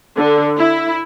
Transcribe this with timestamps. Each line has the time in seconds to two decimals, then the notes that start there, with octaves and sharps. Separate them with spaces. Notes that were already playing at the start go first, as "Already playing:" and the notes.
0.16 D3
0.58 E4